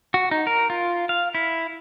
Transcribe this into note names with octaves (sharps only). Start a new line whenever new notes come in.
F#4
D#4
A#4
F4
F5
E4